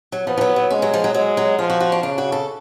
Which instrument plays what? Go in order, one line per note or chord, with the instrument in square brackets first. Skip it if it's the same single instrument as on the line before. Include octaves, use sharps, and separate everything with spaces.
[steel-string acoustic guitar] F#3
[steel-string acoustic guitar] F3 [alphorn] B3
[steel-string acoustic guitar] F3
F#3
F#3
[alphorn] G#3 [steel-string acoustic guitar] C#4
[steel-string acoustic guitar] F#3
F3
F#3
[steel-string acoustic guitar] F#3 [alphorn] G#3
[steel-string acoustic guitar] F#3
[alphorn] F3 [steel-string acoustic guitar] F4
[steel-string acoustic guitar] F#4
F#4
D4
[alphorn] C#3 [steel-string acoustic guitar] D4
[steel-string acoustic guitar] F#4
A4